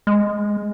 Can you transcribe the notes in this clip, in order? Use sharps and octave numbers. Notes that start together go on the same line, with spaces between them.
G#3